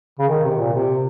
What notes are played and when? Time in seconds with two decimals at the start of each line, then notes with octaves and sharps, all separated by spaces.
0.19 C#3
0.28 D#3
0.44 C3
0.58 A#2
0.74 C3